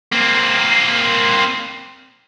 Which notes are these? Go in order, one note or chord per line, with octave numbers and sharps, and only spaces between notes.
A#3 C4